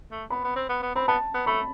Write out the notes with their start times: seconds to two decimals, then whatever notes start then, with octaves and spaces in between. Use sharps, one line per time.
0.11 A3
0.30 B3 B5
0.44 B3
0.56 C4
0.69 B3
0.83 B3
0.95 C4 B5
1.08 B3 A5
1.34 B3
1.46 A3 B5